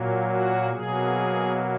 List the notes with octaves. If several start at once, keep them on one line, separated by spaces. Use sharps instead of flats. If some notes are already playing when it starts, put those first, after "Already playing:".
Already playing: A#2 F#3 A#3
F#4
B2 F#3 A#3 G#4